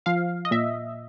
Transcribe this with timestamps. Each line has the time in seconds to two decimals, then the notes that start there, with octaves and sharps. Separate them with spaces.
0.06 F3 F5
0.45 D#5
0.51 A#2 E5